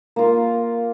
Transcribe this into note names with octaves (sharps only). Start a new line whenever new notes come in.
A#3 F4